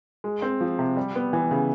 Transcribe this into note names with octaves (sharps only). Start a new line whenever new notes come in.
G#3
C4
F3
C3
G3
B3
E3
C#3